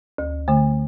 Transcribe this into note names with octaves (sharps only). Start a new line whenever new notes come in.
D2
D3 A3